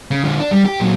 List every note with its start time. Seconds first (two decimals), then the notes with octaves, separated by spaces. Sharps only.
0.11 C#3
0.24 D3 F3
0.40 D4
0.51 G3
0.65 G4
0.80 A#2 F#3